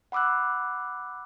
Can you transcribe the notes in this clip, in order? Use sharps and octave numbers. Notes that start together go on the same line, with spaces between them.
F#5 B5 D6 E6 F#6